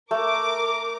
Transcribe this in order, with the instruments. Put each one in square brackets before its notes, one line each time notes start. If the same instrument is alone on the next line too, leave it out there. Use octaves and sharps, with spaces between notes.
[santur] A3 [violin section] A#4 D6